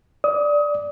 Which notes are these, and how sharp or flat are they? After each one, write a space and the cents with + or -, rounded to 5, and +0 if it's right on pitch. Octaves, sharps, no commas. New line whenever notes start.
D5 +0 D#6 +30